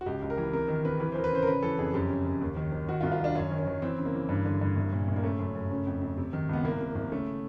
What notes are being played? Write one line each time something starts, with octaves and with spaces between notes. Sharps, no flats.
F#4
C#2 G4
C#2
A#4
E3
C3 A#4
D#3
C3 B4
E3 B4
C5
E3 A#4
B4
C#3 C5
A#4
C#3 B4
E3 A4
F2 G#4
F#2 G4
C#3
F#2
D#2
D#3
D#3
D#3 F#4
F4
C2
F4
D#3 D4
F#2 C#4
D#3
C#4
D#3
E3 C4
C#3
A#3
E3
G2
D3
G2
C2
A#2
C2
A#3
C#3 A3
F#2
F#2
C#3
F2
F2
C3
D#3
C#2 B3
C2 A#3
C3
C2
C#3 A3